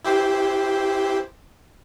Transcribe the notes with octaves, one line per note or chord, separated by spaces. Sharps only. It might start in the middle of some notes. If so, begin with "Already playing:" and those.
E4 G4 C5